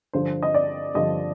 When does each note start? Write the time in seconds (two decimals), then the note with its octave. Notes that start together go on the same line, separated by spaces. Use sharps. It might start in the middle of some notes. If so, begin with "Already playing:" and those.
0.13 G2 D3 F3 C5
0.43 D#5
0.54 D5
0.94 G2 D3 F3 D#5